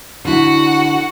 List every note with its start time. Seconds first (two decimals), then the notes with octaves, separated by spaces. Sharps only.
0.25 D3 E4 F#4 F#5